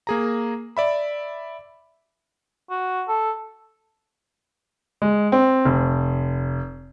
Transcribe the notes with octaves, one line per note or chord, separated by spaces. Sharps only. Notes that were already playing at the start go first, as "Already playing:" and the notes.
A#3 G#4 A#5
D5 E5 B5
F#4
A4
G#3
C4
F1